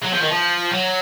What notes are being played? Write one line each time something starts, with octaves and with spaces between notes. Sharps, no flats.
F#3
F3
D#3
F3
F#3